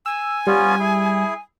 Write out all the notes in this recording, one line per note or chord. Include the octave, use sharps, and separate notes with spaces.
G#5 E6
G3 B3 C#4 F4
E4 G#4